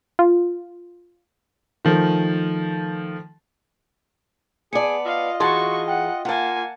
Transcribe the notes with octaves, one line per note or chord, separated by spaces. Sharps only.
F4
D#3 F3 A3
B3 G#4 D5 G#5 A5 C#7
F4 D#5 F5
E3 F#4 G#4 A5 C6 C#6
F#5 G5
A#3 F4 F#5 G#5 A5